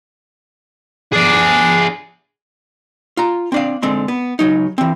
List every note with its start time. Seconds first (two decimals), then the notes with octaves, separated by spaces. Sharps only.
1.13 D4 G#4 D5
3.17 F4 A#5
3.52 C4 D4 F5
3.83 D3 G#3 C4 C6
4.08 B3
4.39 C#2 F#3 D#4
4.78 E3 C4